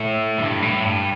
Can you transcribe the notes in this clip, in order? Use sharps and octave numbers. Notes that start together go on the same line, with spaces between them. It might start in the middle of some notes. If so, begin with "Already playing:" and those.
Already playing: A2
G2
A2
G2